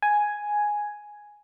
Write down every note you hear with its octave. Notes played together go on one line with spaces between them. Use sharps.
G#5